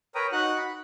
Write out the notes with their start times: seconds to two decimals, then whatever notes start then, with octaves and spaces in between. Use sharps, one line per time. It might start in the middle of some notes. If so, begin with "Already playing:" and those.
0.15 A#4 B4 C#5 G5 A#5 D#6
0.32 D#4 F#4 F#5 F#6
0.58 B5